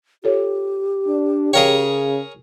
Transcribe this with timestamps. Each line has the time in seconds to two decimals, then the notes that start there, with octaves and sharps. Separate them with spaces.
0.24 F4 G4 A4 C#5
1.07 D4
1.53 C#3 G#4 A#4 C#5 D5 F5 G5